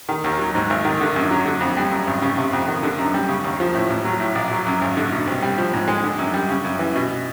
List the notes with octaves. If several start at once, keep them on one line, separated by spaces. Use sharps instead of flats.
D#3
D#2
F#3
G#2
G#1
D#3
D3
F#2
F#3
D3
F2
G3
F#2
G#1
C#3
C3
F2
D#3
D3
F#2
G3
C#3
D#2
F3
A2
A1
F#3
A2
A#1
F#3
F#2
G#1
D3
B2
C2
G3
F3
G#2
G#3
D3
F#2
G3
C#3
F#2
E3
B2